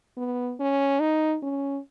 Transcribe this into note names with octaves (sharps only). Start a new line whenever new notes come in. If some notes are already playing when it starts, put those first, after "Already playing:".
B3
C#4
D#4
C#4